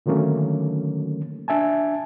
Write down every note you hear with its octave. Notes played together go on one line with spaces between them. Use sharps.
D3 D#3 F#3 A3 A#3 C#4
D4 E5 G#5 A5